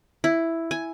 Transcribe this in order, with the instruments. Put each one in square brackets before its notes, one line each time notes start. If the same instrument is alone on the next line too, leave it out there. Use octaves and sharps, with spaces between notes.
[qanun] E4
G#5